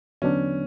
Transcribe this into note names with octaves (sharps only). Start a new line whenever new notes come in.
E2 D3 F#3 B3 C#4 D4